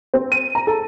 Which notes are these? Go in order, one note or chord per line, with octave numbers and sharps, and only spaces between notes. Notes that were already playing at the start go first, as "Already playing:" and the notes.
C4
D#7
A#5
A4